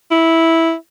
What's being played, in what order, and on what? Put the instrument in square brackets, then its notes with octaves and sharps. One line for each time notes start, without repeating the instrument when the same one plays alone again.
[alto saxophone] E4